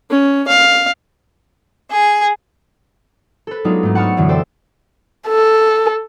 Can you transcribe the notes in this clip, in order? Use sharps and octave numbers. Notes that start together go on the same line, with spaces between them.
C#4
F5
G#4
A4 B4
F#3 G#3 B3 D4 D#4 F4
G#2 A3
F#5 A5 B5 C#6 D#6 F6
F#2 B2 D3 E3 F#3
A4 C5 D5 E5 G5
A4